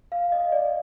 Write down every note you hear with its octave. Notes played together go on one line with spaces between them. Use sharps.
F5
D#5
D5